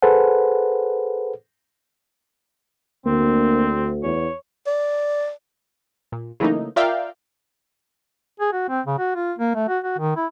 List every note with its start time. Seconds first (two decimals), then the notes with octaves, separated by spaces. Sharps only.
0.02 G#4 A4 B4 C5 F#5
3.06 D2 A#3 C4
4.03 E2 C#5
4.67 D5
6.12 A#2
6.40 C#3 E3 F#3 A3 A#3 D#4
6.76 F4 A#4 D5 E5 F5 G5
8.40 G#4
8.53 F#4
8.69 C4
8.86 C#3
8.98 F#4
9.15 F4
9.39 A#3
9.55 A3
9.68 F#4
9.84 F#4
9.98 D#3
10.16 E4